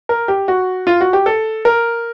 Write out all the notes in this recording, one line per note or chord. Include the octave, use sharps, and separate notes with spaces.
A#4
G4
F#4
F4
F#4
G4
A4
A#4